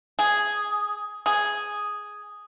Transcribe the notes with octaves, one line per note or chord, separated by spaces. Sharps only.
G#4
G#4